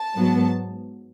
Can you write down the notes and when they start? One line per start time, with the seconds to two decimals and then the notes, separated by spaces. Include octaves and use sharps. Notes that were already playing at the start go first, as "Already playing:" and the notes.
Already playing: A5
0.16 G#2 F#3 B3